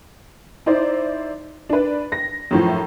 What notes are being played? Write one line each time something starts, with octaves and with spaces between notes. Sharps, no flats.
D#4 E4 C5 D5
D4 B4
A#6
F#2 A2 F3